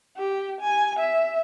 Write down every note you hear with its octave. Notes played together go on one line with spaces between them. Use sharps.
G4
G#5
E5